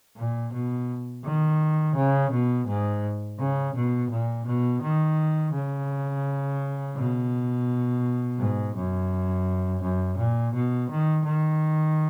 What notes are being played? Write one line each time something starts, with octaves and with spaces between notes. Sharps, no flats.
A#2
B2
D#3
C#3
B2
G#2
C#3
B2
A#2
B2
D#3
C#3
B2
G#2
F#2
F#2
A#2
B2
D#3
D#3